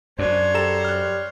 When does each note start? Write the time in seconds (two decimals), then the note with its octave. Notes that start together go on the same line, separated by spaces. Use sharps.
0.19 F#2 D4 C5 C#5
0.54 G3 A4 A#5 E7
0.84 F6 F#6